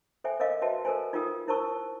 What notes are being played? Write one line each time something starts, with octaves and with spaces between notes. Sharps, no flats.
A4 C5 E5 G5 G#5
A#4 C5 D#5 F5 D6
F#4 B4 C5 E5 G5 A5
A4 A#4 C5 G#5
D#4 F4 G#4 A#4 G5 D#6
E4 A#4 C5 A5 C#6 E6